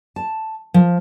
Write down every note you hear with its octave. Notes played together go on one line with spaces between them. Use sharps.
A5
F3